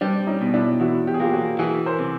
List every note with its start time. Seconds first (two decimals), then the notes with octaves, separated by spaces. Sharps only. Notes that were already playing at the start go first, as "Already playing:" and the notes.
0.01 G3 C4 D4
0.27 C#4 D#4
0.41 B2
0.54 D4 E4
0.80 E2 E4 F#4
1.07 G4
1.14 G#4
1.20 A#3 F4 G4
1.33 F#4 G#4
1.59 E3 F#4 G#4
1.86 A#4 C5
1.99 C3